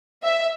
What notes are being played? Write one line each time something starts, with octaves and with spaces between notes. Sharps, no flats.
E5